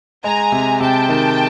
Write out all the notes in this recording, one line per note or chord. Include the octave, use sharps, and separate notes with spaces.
G#3 G#5 A#5
C3
C3 G5 A5
D#3